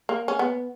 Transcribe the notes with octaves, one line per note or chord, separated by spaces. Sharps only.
A#3
C#4
B3